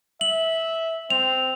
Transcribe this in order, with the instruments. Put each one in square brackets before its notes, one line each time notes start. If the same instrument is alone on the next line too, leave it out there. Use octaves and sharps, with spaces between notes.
[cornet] E5 [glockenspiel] F#7
[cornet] C4 [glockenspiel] F7